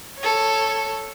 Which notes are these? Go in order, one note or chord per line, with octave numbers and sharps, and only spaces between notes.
A4 C#5